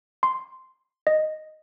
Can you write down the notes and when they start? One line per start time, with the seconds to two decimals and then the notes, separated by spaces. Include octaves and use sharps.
0.23 C6
1.07 D#5